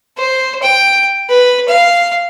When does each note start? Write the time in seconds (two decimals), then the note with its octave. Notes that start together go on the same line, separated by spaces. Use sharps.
0.17 C5
0.62 G5
1.29 B4
1.68 F5